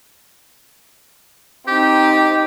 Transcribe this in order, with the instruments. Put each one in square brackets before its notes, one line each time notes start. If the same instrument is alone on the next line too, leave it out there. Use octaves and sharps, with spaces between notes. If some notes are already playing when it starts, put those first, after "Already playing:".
[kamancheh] C4 D#4 [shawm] G4